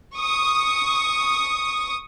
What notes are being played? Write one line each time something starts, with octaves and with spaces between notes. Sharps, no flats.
C#6 D#6